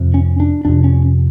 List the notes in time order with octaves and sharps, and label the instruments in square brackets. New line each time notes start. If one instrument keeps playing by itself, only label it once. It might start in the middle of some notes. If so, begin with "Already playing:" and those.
Already playing: [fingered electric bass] F2 C3
C#4
D4
F2 C3 D4
C#4